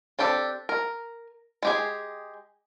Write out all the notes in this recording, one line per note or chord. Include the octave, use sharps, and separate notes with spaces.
C4 D4 G4 A4
A#4
G#3 G4 G#4